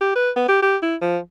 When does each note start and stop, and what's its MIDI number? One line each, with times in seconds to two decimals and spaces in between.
0.01 0.14 67
0.15 0.30 71
0.36 0.46 59
0.48 0.57 67
0.62 0.77 67
0.82 0.96 64
1.01 1.18 53